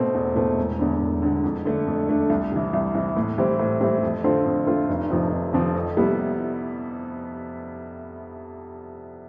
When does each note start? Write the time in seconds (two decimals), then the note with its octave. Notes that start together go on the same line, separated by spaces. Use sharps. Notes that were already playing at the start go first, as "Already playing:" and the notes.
Already playing: B2 A3 C4
0.14 E2
0.36 B2 A3 C4
0.58 E1
0.79 E2 D3
1.01 E1
1.22 E2 D3
1.44 F2
1.65 D3 A3 D4
1.87 F2
2.08 D3 A3 D4
2.30 C2
2.52 C3 E3
2.73 C2
2.95 C3 E3
3.16 A2
3.38 E3 G3 C4
3.59 A2
3.81 E3 G3 C4
4.02 F2
4.24 D3 A3 C4 F4
4.45 F2
4.67 D3 A3 C4 F4
4.89 F1
5.10 F2 C3 F3 C4
5.32 F1
5.53 F2 C3 F3 C4
5.75 F2
5.97 C3 G3 B3 E4